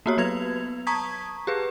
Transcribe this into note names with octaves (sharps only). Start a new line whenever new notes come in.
A#3 B3 F#4 G4 C#5
F#3 B3 B4 G#6 F7
A5 A#5 C#6 D#6 G#6 B6
G4 G#4 B4